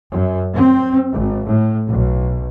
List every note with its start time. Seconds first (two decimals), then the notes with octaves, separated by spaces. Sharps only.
0.10 F#2
0.55 C4
1.12 G#1
1.46 A2
1.89 B1